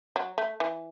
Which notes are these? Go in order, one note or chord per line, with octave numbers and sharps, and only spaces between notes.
F#3
A3
E3